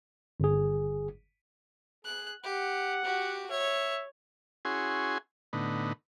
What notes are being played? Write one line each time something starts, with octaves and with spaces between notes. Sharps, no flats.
G1 G#4
G#4 F#6
G4 F#5
F#4 G4
C#5 E5
C#4 E4 F#4 G#4 G#5 C6
A2 D3 B3 D#4